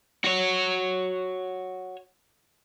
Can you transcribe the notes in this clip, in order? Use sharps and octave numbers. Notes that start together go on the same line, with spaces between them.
F#4 C#5